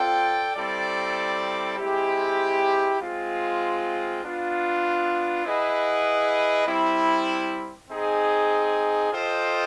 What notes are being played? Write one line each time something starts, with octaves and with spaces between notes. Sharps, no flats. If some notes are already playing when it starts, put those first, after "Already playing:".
Already playing: C4 F4 A4 D5 G5
G3 C4 E4 A4 D5
G#3 C4 E4 G4
G#3 C4 F4
B3 D4 F4
E4 G#4 B4 D#5 F#5
G3 C4 E4
C4 D#4 G#4
F4 A4 C5 D#5 G5